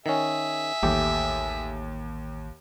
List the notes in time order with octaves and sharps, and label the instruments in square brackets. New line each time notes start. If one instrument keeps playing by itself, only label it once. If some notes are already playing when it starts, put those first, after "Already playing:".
[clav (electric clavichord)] D#3 C#4 [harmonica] G#4 E5
[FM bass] A1 [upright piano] D#2 [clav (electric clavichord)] A3 G4